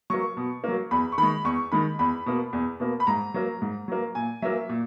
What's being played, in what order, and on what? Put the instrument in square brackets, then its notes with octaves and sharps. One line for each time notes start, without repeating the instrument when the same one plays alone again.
[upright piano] F#3 A#3 C#6
B2
F#3 A#3
E2 B5
C#6
D#3 G#3 B5
E2 C#6
D#3 G#3 B5
E2 B5
B2 A#3
E2
B2 A#3
B5
G#2 A#5
F#3 A#3
G#2
F#3 A#3
A#2 G#5
F#3 A#3 E5
A#2